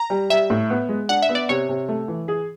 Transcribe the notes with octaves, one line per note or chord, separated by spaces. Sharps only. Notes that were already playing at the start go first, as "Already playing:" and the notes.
Already playing: A#5
G3
G3 E5
A2
B3
G#3
D4 F#5
E5
B3
D5
C3 C#5
C3
A3
E3
G#4